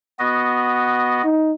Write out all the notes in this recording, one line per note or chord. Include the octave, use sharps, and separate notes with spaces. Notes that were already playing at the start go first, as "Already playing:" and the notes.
B3 F#4 D#5
D#4